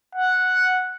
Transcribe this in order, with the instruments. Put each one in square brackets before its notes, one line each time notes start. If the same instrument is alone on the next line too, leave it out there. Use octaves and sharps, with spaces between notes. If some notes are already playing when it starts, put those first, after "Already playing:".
[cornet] F#5